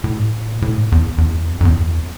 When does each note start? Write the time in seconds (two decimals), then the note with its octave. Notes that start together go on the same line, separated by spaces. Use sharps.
0.04 A2
0.55 A#2
0.62 A2
0.92 E2
1.18 E2
1.50 F2
1.61 F2
1.65 E2